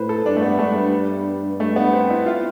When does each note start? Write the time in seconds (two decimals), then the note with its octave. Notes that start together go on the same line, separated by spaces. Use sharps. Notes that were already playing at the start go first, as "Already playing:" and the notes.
Already playing: A2 B4 C5
0.09 A4
0.25 G2 D4
0.37 A3
0.42 B3
0.59 A3
0.75 G3
1.60 A3
1.76 B3
1.93 C4
2.10 E4
2.26 F4